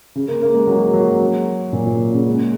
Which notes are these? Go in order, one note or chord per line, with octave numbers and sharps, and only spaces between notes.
C#3
A#3
A#3
G#3
F#3
F#3
A#2
A#2
C#3
G#3